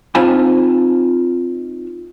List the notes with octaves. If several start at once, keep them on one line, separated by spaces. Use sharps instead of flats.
C4 D#4 F4 G#5 A5 B5